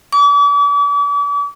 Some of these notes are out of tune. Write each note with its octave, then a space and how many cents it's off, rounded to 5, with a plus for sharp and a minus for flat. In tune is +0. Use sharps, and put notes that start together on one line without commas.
D6 -40